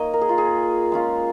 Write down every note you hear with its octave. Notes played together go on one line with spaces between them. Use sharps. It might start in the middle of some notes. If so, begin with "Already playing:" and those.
Already playing: A#3 D#4 C#5 D#5
A#4
G#4
F4
G#4
G#3 C#4 F4